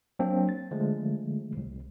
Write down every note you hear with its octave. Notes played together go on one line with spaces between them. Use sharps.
F#3 A#3 C4 D4
A6
D3 F3 G#3 A3
C2